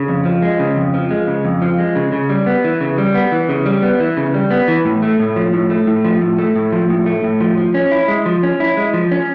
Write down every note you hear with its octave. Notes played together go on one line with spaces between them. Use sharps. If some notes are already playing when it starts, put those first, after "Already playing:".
Already playing: C#3
F2
F3
G#3
C#3
F2
F3
G#3
C#3
F2
F3
G#3
C#3
C#3
G3
B3
E3
C#3
G3
B3
E3
C#3
G3
B3
E3
C#3
G3
B3
E3
A2
A3
A2
F3
A2
A3
A2
F3
A2
A3
A2
F3
A2
A3
A2
F3
F3
C#4
E4
G#3
F3
C#4
E4
G#3
F3
C#4